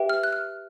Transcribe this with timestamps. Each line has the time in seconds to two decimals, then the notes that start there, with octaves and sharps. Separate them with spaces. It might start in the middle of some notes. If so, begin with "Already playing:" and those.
Already playing: G4 B4 E5 G5
0.09 F6
0.24 F#6
0.33 F6